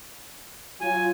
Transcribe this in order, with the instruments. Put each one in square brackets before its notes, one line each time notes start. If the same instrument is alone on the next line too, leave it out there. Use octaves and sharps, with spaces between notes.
[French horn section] F#3 F4 [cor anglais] G#5